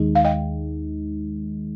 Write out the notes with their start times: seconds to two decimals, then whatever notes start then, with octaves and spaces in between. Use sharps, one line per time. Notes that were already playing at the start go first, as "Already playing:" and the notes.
Already playing: D#2 D#3 G#3 D#4
0.15 F5
0.25 D#5 G5